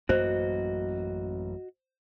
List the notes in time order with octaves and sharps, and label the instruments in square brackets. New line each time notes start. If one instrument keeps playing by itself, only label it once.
[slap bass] A1 F#2 A#3 [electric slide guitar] F#4 D#5 [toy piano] C5